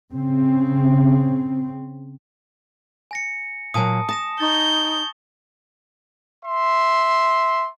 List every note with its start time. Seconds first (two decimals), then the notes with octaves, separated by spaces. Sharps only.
0.13 C#3 C4
3.11 G#5 A#6 C#7
3.74 A#2 F#3 G#5 A5 D#6
4.09 A5 D#6 A#6 E7
4.40 D#4 C#6 G6 A6
6.44 E5 C6